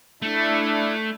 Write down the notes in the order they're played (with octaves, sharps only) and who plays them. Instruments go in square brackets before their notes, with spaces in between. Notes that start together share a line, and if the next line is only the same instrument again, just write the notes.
[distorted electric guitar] A3 [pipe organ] D4 E4